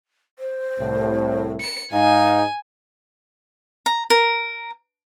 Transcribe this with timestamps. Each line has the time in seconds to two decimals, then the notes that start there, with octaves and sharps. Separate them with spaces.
0.39 C5
0.78 C2 A2
1.61 C#7
1.92 G#2 D#4 F5 G#5
3.86 A#5
4.10 A#4